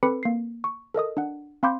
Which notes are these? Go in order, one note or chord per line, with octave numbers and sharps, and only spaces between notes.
C4 A4 B4 B5 D6 C#7
A#3 C7
C#6
A4 A#4 D#5 D#6
D4 F#5
C4 F5 B5 C6 D6 G6